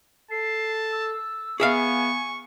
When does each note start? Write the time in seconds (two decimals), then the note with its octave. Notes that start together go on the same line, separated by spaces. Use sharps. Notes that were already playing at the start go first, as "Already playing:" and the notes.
0.31 A4 A5 C7
0.92 E6
1.60 B3 G#4 E5 F5 G#5 C#6